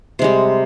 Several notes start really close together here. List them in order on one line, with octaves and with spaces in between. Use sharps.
C3 G#3 G3